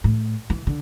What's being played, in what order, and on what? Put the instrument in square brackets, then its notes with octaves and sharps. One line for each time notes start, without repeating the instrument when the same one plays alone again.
[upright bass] A2
E3
D3